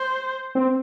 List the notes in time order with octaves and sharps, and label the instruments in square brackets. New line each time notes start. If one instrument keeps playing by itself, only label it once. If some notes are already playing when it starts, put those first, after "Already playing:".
Already playing: [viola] C5
[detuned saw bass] C4